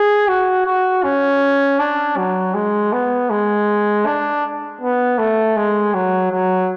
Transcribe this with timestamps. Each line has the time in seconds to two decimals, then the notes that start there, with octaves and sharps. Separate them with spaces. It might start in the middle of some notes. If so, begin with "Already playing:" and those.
Already playing: G#4
0.28 F#4
0.65 F#4
1.03 C#4
1.79 D4
2.17 F#3
2.54 G#3
2.93 B3
3.30 G#3
4.06 D4
4.81 B3
5.18 A3
5.57 G#3
5.94 F#3
6.32 F#3